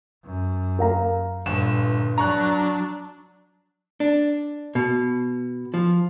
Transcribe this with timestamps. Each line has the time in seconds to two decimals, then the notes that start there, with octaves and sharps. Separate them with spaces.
0.25 F#2
0.79 A#4 F5 A#5
1.46 G1 G2 A#2 E7
2.18 F#3 D4 A#5 C#6 F#6
4.00 D4
4.75 B2
5.74 F3